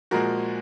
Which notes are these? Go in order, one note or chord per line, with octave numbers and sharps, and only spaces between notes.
A#2 F3 G#3 F#4 A#4